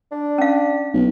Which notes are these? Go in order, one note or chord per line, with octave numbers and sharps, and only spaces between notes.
D4
C#4 F5
B1